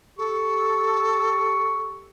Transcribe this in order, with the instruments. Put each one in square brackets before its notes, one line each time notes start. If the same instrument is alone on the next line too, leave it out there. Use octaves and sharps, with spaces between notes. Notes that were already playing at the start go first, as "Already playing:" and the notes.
[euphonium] G4 [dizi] A4 [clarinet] C#6